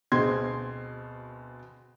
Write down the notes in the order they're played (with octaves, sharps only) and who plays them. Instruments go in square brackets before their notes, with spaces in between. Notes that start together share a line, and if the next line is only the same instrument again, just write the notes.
[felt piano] D2 B2 C4 G#4 C6 G#6